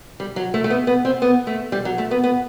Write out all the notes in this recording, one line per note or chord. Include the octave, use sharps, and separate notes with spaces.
G3
F#3
A3
A3
B3
B3
C4
B3
A3
G3
F#3
A3
B3
B3